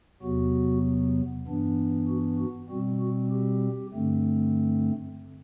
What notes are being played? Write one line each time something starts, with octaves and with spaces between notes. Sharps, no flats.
E2 C3 F#3 B3 F#4
G2 E3 B3 D4
F#4
F#4
B2 G3 C4 F#4
F#4
G4
G2 D3 A3 C4